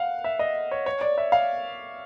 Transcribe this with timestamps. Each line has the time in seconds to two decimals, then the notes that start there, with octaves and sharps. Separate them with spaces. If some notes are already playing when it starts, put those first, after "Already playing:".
Already playing: F5 F#5
0.24 E5
0.39 D#5
0.71 C#5
0.86 C#5
1.01 D5
1.18 E5
1.32 F5